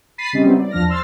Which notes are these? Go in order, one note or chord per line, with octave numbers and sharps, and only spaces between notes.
B5 A6 B6 C7 D#7
C#3 G3 C4 C#4 D#4
F#3 G3 B3 C4 E4
D5
E2 F3 D4 F6 A#6
C5 C6 E6 F6 A6